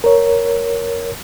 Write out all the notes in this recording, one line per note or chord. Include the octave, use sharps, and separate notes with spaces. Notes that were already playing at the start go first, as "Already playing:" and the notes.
A#4 C#5